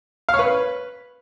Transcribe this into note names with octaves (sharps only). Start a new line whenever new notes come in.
F5
C#5
B4